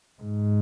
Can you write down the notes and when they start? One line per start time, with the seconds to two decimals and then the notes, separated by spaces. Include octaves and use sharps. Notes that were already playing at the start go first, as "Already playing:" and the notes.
0.22 G#2